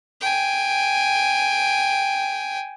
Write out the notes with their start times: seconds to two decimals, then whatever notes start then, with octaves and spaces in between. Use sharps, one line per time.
0.21 G5 G#5